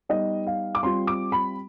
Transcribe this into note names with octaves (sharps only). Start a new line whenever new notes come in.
G3 B3 D#4 D#5
F5
D6
G3 C4 F4 C6
D6
B5